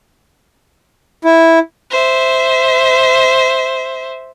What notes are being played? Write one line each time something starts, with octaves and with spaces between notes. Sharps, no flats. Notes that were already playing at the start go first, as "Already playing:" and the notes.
E4
C5 E5